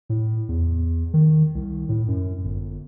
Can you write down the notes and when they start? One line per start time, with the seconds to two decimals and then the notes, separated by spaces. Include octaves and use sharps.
0.10 A2
0.49 E2
1.14 D#3
1.55 C2
1.89 A2
2.08 F#2
2.44 G1